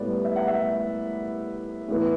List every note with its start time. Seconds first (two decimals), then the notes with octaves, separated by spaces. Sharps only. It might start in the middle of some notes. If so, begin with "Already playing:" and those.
Already playing: A2 G3 B3 D5
0.25 E5
0.36 F#5
0.48 E5
1.88 A2 E3 B3